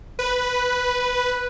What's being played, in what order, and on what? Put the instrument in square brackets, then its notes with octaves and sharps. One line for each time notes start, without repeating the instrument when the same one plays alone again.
[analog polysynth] B4